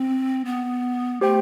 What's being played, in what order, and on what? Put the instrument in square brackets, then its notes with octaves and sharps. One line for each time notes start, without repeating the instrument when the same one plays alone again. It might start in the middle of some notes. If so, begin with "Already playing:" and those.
Already playing: [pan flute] C4
B3
[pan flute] A3 [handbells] G4 C5 G5